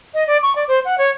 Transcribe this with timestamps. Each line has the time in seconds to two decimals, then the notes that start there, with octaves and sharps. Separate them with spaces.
0.14 D#5
0.27 D5
0.43 C#6
0.55 D5
0.68 C5
0.85 F#5
0.98 C#5